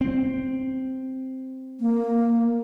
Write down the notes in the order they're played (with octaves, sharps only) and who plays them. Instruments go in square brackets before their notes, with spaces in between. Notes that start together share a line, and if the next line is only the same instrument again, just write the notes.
[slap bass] C4
[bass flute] A#3